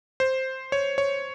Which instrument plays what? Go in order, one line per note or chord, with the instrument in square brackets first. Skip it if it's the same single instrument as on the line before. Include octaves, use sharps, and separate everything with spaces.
[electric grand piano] C5
C#5
C#5